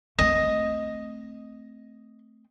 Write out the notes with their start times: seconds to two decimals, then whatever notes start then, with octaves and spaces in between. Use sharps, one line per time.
0.19 A3 C4 D#5